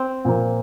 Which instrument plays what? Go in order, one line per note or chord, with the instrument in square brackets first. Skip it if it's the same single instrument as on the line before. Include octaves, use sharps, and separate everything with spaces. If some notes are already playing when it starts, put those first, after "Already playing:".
Already playing: [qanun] C4
[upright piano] A#2 F3 A#3